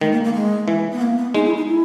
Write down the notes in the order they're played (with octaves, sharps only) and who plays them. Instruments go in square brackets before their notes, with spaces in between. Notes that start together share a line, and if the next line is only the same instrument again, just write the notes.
[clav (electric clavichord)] D#3 [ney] G#3
[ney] A#3
A#3
G#3
[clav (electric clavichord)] E3
[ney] B3
A#3
B3
[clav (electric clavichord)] G#3 [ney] D#4
[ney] E4
D#4
E4